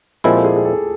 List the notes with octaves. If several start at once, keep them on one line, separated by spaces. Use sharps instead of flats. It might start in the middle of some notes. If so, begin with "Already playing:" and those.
A#2 F3 G#3 C4 E4 G4
A4
G#4
G#4
A4